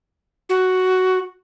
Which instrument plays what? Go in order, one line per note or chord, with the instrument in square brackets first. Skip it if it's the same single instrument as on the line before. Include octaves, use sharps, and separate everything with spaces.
[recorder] F#4